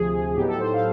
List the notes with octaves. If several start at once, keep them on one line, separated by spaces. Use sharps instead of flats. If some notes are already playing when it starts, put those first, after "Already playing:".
Already playing: D2 C3 F3 G#4
A2 F#3 B3 D#4 G4
A4
C5
F5